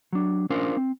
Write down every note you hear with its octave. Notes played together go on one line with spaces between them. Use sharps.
F#3 D4
C#4 D4 F4 A#4 C5
C4